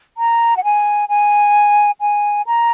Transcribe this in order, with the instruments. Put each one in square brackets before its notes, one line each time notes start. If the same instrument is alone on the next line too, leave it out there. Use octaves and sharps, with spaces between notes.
[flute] A#5
F#5
G#5
G#5
G#5
A#5